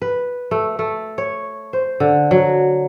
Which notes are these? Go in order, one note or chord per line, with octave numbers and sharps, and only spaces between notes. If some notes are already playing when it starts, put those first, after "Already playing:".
B4
A3
A3
C#5
C5
D3
F#3